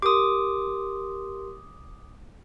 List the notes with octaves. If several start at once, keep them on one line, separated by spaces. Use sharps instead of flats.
G4 A#4 C6 D6 D#6